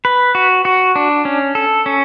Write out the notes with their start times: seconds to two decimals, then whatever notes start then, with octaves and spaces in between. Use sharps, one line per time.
0.05 B4
0.35 F#4
0.65 F#4
0.96 D4
1.25 C#4
1.55 A4
1.86 C#4